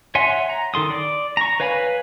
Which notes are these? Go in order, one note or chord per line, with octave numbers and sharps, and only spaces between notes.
C#5 E5 F#5 G#5 C6
A#5
D#3 A4 C6 D#6
D5
A#5 C#6
B4 C#5 F5 G#5 B5